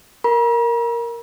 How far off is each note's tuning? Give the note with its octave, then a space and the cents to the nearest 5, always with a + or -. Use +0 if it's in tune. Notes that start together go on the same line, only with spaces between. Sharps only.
A#4 +0 A#5 +45